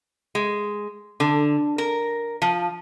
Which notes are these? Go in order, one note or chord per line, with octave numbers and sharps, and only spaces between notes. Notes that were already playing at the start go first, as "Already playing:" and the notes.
G#3
D3
A#4
F3